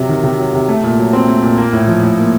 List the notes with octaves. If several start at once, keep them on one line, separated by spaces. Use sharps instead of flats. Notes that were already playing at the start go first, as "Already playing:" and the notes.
Already playing: C3 F#3
D#3
C3
F#3
C3
A3
A#2
F#3
C4
A3
A#2
A#3
A2
F3
A2
A#3